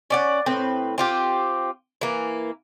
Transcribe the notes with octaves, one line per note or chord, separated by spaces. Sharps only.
C#4 D5 F#5
A2 C4 B4
C4 F4 G4
E3 A#3